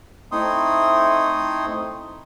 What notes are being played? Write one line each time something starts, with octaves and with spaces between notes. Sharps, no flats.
A3 C4 D#4 E4 C6 D#6